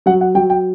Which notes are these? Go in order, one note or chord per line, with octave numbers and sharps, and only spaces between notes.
F#3 F#5
F#5
F#3 G5
G5